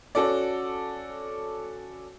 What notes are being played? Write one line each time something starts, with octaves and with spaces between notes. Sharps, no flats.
C#4 F#4 A4 D5